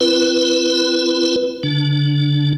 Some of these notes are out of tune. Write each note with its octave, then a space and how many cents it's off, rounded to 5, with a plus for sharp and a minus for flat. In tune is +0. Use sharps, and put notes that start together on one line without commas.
C4 +0 E4 +40 B4 +0
D3 -40 D4 +0